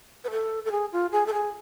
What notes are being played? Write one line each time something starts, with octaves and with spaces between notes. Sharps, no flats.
B4
A4
A4
G#4
F4
G#4
A4
G#4